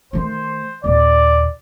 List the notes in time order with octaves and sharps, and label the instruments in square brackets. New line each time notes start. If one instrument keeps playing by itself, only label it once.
[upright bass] D#3 A3 [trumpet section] C5
[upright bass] D#2 A#2 [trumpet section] D5